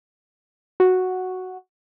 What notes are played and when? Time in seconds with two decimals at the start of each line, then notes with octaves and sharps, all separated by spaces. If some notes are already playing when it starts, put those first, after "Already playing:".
0.80 F#4